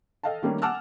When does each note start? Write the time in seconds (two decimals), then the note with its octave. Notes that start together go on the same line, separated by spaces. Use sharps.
0.23 A4 D#5 F5 G5 A5
0.43 D#3 G3 A3 A#3 C#4 D4
0.62 F#5 G#5 A5 D6 E6 F6